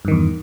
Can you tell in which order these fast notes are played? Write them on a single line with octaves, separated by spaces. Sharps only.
G2 D#3 E2